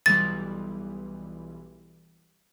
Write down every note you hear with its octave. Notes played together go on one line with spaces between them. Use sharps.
B1 E3 G3 A6